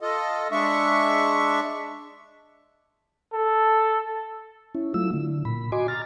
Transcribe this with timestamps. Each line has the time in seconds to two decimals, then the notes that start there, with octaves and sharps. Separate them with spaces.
0.01 F4 A4 D#5
0.52 G#3 D4 E5 C#6
3.33 A4
4.75 C#4 E4
4.94 F#3 A3 E4 F4 E6
5.13 D3
5.45 A#2 B5
5.72 F#4 D#5 G#5 C6 D6
5.88 A#5 F6 A6